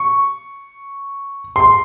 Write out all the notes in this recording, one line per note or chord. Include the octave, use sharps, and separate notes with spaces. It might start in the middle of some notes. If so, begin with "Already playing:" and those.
Already playing: C#6
C6